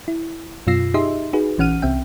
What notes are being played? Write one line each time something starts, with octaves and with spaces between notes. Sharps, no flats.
E4
F#2 B2 F4 E6 A#6 C7
D#4 G4 G#4 D#5 E5 C6
D#4 F#4 G#4 B4
A#1 E3 C#4 F#5 F6 D#7
C2 C4 E5 G5